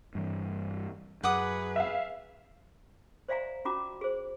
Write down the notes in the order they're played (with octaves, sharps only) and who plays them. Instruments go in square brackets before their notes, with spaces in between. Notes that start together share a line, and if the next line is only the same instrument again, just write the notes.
[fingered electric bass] G2 E3
[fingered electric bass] F#2 [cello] G#4 B4 [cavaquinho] F#5 D6 D#6
[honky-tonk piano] E5 F5
[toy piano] C5 D5 E5 F5 G#5 A#5
C#4 F4 F#4 A#5 D6
G#4 C5